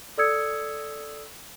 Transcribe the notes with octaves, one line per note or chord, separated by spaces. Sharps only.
A4 D5 D#6 E6 G#6 C#7